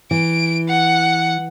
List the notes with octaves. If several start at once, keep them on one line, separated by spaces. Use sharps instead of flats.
E3 D7
F#5